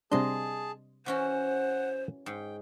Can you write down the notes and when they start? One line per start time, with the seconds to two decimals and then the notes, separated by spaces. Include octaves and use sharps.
0.12 C3 G3 D4 G#4 D#5 A5 C6
1.06 E3 C#4 F#4 C5 F#5
2.26 G#2 G5